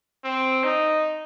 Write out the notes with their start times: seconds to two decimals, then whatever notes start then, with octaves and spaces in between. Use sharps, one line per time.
0.24 C4
0.64 D#4